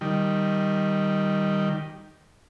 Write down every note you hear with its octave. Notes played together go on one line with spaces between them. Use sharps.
D#3 G3